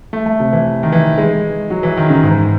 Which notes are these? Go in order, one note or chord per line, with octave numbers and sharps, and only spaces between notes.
A3
A3
C3
E3
D#3
E3
G#3
F#3
E3
D#3
C#3
G#2